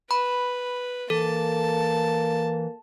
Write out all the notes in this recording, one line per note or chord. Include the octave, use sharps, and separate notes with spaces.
B4 B5
E3 A#3 A4 A5